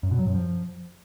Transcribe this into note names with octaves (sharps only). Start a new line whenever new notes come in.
F#2
B2
F#3
F#2
F3